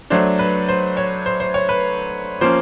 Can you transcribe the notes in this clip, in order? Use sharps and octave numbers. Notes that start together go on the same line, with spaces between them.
F#3 A3 D4 C5
B4
C5
C#5
C5
C5
C#5
B4
F3 A#3 C#4 C5